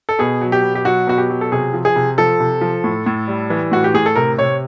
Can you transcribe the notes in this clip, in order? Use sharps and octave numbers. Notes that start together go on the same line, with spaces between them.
A4
B2 G#4
F#3
G4
B2
G4
F#3 F#4
B2 F#4
G4
F#3
A4
C3 G#4
F3
G#4
C3
F3 A4
C3
F3
A2
A2
G3
E3
A2 F#4
G4
A2 G#4
A4
C3 A#4
C3 C#5